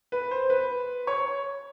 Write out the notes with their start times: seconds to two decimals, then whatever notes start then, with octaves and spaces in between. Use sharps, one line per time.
0.12 B4
0.31 C5
0.50 B4
1.07 C#5